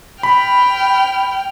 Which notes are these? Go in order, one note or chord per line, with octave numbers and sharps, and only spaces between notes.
G5 B5 F6